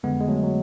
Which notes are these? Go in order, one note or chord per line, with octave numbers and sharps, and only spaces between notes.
F2 D3 G#3 B3
G#3
F#3 A3
F#3